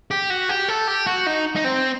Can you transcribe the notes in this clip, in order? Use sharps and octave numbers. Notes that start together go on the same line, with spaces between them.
G4
F#4
G4
A4
G4
F#4
D#4
D#4
C4